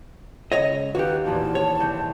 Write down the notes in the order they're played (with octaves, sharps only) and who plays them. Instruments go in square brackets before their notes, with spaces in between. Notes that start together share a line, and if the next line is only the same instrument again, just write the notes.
[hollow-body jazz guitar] C#2 C#5 D#5
[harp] D#2 F5 [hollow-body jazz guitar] F#4 G4 [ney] B4
[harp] A#1 E2 A#2 [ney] A5
[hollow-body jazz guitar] C#5
[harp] C2 G6